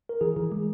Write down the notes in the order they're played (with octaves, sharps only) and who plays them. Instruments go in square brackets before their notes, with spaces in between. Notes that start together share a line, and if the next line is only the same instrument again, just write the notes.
[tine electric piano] A#4
[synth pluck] E3 [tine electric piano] G#4
[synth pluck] E3
G#3